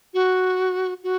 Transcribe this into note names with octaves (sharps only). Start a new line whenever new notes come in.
F#4
F#4